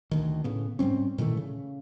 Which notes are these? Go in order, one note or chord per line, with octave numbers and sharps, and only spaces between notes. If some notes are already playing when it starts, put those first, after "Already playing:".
D2 D#3
A2 C#3 B3
G#2 G3 C4 C#4
A#2 D#3 E3 A3
C#3